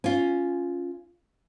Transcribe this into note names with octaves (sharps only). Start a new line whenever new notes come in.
C#4 F4